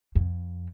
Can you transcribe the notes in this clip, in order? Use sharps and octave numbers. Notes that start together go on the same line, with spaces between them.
F2